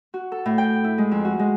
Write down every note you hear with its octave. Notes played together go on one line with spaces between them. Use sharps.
F#4
A4
A2
G5
E4
G#3
F2
F#4
G#3